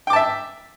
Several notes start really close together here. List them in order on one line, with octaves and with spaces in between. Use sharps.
G5 D6 A5 E5